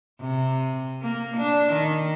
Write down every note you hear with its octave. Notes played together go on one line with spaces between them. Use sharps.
C3
A#3
D4
D#3